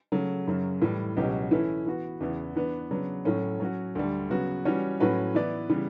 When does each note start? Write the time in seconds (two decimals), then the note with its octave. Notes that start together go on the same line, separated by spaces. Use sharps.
0.12 C#3 F#3 A3
0.47 F#2 C#3 F#3
0.82 A2 E3 G3
1.17 C#2 B2 F#3 C#4 G4
1.51 E3 A3 C#4 E4
1.86 E3 B3 F#4
2.20 E2 C#3 E3 B3 E4
2.56 E3 B3 D4
2.91 C#3 F#3 B3 D4
3.25 A2 F#3 A3 C#4
3.60 F#3 C#4 F#4
3.95 D2 D3 G3
4.30 C#3 F#3 B3 F#4
4.65 E3 G3 C#4 F#4 C#5
5.00 A2 F#3 C#4 F#4 B4
5.35 E3 B3 E4 B4 D5
5.69 C#3 E3 G3 B3